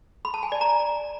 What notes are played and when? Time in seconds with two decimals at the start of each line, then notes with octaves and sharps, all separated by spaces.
0.25 B5
0.34 A5
0.43 G#5
0.52 D5
0.61 A#5